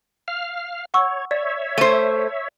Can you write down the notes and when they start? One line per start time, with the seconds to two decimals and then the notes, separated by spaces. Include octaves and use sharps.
0.28 F5 F6
0.94 C#5 F#5 C#6 E6
1.31 C#5 D5 E5
1.78 A3 C5 D#7